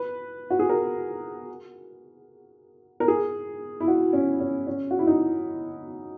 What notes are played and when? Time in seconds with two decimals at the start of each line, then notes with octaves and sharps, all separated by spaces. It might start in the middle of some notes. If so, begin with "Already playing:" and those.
Already playing: B4
0.50 F#4
0.59 G#4
0.69 A#4
3.00 A#4
3.08 G#4
3.80 E4
3.88 F#4
4.13 C#4
4.40 C#4
4.67 C#4
4.91 F#4
4.99 E4
5.07 D#4